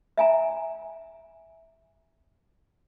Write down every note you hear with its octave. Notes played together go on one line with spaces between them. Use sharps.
E5 G#5 A#5